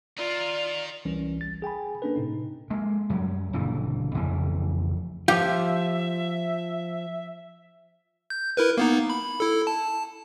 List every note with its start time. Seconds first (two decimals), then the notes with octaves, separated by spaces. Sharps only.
0.18 D#4 F4 A#4 D5
1.05 C2 E3 G3 C#4
1.37 G#1 A6
1.62 G#4 G5 G#5 B5
2.02 A#3 C#4 D4 A4 B4
2.16 A2 C3 D#4
2.70 G#3 A#3
3.10 F#2 F#3 G3
3.53 F#1 A#2 D3 E3
4.15 A1 F2 C#3 E3
5.28 F3 F4 G4 E5
8.30 G6
8.57 E4 A#4 B4
8.77 A#3 B3 D#4
9.10 B5
9.40 E4 A4
9.67 A5